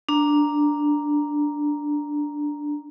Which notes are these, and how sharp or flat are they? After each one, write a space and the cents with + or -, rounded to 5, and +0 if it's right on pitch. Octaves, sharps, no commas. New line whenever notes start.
D4 +0 A#5 +0